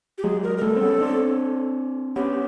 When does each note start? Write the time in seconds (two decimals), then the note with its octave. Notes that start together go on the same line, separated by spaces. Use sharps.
0.18 G4
0.23 F#3 G#3 G#4
0.43 A#4
0.58 A#4
0.62 G3 A3 A4
0.76 C4
0.81 B3 C#4
1.01 C4 D4
2.16 B3 C#4 G4